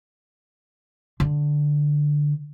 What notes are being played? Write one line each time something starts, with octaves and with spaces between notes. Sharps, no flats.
D3